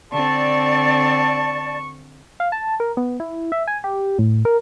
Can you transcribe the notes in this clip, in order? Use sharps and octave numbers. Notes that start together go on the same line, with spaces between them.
D3 C4 D5 A5 C#6
F5
A5
A#4
B3
E4
E5
G#5
G4
A2
A#4